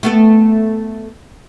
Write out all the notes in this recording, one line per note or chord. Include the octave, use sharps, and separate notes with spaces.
A3 B3 A4